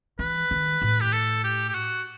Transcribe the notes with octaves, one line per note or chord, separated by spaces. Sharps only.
E3 B4
D#3
A2
G4
A4
G4
G4
F#4